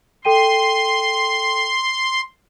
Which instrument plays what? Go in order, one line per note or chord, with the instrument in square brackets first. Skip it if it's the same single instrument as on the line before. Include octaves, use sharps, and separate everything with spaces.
[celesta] A4 G5 D#7 [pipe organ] C6